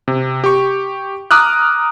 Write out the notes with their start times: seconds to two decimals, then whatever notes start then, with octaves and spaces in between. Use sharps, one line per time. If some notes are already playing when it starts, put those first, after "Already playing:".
0.08 C3
0.44 G4 C#6
1.31 A#5 D6 D#6 F6 F#6